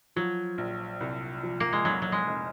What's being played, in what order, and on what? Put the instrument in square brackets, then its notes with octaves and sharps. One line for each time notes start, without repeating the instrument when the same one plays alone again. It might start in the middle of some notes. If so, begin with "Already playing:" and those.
[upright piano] F3 [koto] F#3
[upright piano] A#1
C2
F3
[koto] A#3
G#3
[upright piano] F1 [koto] F#3
[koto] F#3
G#3
[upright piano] F1